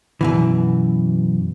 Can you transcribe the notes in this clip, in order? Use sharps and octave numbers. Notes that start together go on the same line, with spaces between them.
F#2 B2 E3